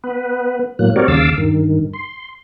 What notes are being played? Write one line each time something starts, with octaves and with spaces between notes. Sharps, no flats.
B3 B4
A2 F#3 A#3 F#6
G3 C4 F#4 A#4 C#5 D5
D#2 C#3 F5 A5 D6 E6
G2 D#3
C6